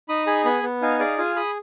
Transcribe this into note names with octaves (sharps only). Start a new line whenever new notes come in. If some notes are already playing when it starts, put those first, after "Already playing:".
D#4 B5 D#6
G#4 G#5 B5
B3 G#5 B5
B3
D#4 F5 G#5
G#4 D5 F5
F4 F5 G#5
G#4 B5 D#6